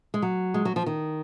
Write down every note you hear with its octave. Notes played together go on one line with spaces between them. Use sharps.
G#3
F#3
G#3
F#3
F3
D#3